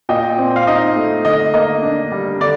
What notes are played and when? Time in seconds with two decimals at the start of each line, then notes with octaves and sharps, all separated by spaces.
0.09 A#2 D#5 G5
0.38 C4
0.56 F5
0.67 D#4 D#5
0.96 A3
1.25 D3 D#5
1.54 A#3 D#5
1.83 D4
2.12 G3
2.40 D3 D5